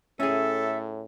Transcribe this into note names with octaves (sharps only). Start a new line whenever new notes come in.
A2 C#4 G#4 A4 E5